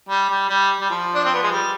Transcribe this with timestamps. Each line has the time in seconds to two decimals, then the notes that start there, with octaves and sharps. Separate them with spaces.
0.09 G3
0.30 G3
0.49 G3
0.81 G3
0.90 F3
1.15 D4
1.25 C4
1.34 B3
1.43 G#3
1.52 G3